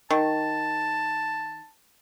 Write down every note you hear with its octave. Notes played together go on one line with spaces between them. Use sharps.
D#3 A5